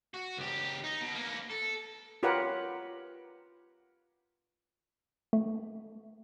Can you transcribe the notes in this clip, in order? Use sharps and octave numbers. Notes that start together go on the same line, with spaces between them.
F#4
C#2 G4
D#4
B2
A#3 B3
A4
F4 G4 A#4 B4 C#5 F#5
A3